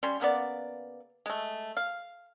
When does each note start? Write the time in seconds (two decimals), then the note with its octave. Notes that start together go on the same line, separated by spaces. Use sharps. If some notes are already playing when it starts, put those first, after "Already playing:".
0.03 G3 C#4 C6
0.20 C#3 A#3 B3 D5
1.26 G#3 A3
1.77 F5